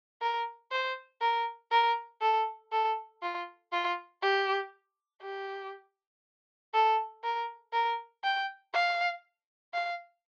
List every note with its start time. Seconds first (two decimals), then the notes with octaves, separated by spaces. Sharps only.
0.22 A#4
0.72 C5
1.21 A#4
1.71 A#4
2.21 A4
2.72 A4
3.22 F4
3.72 F4
4.22 G4
5.22 G4
6.74 A4
7.24 A#4
7.73 A#4
8.24 G5
8.74 F5
9.73 F5